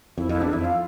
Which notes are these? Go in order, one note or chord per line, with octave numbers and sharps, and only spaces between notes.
F2 E4
F2 E4
E2 D4
F2 E4
F4